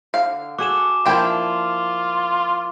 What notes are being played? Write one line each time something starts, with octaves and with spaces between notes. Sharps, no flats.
D3 F5
F#4 G#4 A4 F#5 D6 E7
F3 A#3 D4 E4 F4 G5